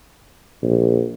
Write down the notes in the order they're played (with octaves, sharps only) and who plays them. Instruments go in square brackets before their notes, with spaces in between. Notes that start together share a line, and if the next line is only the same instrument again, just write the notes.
[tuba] A#1